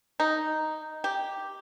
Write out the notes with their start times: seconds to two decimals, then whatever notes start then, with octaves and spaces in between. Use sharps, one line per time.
0.20 D#4
1.04 G4